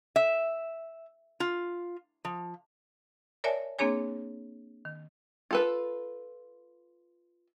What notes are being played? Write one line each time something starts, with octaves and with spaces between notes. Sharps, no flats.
E5
F4
F3
A#4 C#5 D5 E5 G#5 A5
A#3 C4 D4 G#4 C#5 G#5
D#3
F4 A4 B4